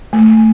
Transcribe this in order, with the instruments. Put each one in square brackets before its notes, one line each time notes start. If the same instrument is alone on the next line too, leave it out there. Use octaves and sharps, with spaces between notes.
[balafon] A3